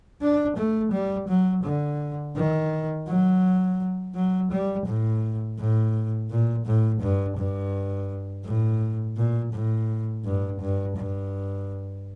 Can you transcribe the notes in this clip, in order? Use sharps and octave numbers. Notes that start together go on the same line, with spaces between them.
D4
A3
G3
F#3
D3
D#3
F#3
F#3
G3
A2
A2
A#2
A2
G2
G2
A2
A#2
A2
G2
G2
G2